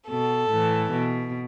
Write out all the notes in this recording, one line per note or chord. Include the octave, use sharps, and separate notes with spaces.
B2 A4
A2 E3
B2